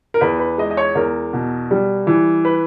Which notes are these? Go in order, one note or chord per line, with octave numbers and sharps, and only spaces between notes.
A#4
E2 B4
B4
G#3 D#5
D#5
C#5
E2 A#4
B2
G3
E3
B4